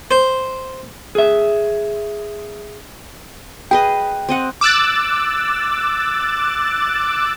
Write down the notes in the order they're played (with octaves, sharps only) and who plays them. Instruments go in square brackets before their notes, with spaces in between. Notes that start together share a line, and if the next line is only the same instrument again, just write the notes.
[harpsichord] C5
[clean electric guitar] G#4 E5
[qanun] G#4 B4 D#5 [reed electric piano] G5
[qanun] C4 D#5 F#5
[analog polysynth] D6 E6 F#6 A6